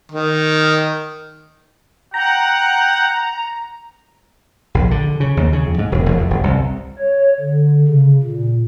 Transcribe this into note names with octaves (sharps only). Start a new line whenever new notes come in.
D#3
F#5 G5 A#5
A#1
D3
C#3
D#2
C#3
F2
G#2
E1
E1
F2
G1
C2
C#5
D3
C#3
A#2